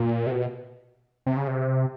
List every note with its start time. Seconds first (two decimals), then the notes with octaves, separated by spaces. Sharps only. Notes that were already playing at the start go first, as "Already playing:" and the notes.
Already playing: A#2
0.27 C3
0.32 B2
1.26 C3
1.37 C#3
1.48 C3